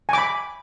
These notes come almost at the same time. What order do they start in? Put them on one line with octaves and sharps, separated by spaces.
G#5 D6 B5